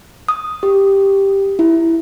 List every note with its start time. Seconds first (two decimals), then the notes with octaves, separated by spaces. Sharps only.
0.29 D#6
0.63 G4
1.59 E4